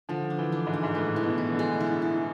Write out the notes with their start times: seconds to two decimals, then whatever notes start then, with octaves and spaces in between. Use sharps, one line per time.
0.09 D3 F3
0.30 D4
0.38 E3
0.52 D4
0.67 G#2
0.73 D4
0.83 G#2
0.95 A2 E3
1.16 E3
1.23 B2
1.38 E3
1.52 D3
1.59 G#3
1.80 E4
2.02 E4